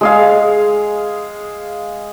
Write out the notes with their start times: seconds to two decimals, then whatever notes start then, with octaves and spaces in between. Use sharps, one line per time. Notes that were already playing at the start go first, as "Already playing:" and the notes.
0.01 G#3 G#4 F5